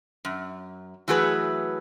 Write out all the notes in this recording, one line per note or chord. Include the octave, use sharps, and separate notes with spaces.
F#2
E3 F#3 A3 F#4 G#4 B4